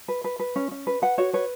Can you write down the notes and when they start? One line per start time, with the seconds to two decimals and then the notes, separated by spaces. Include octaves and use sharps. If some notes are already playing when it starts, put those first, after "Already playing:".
0.08 B4
0.24 B4
0.40 B4
0.56 C#4
0.71 C#4
0.87 B4
1.02 B4 F#5
1.18 F#4 C#5
1.33 B4 C#5